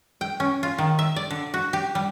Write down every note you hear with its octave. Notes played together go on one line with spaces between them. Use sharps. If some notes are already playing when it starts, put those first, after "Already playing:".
G5
C#4
F4
D#3
E5
D5
D3
F#4
G4
G3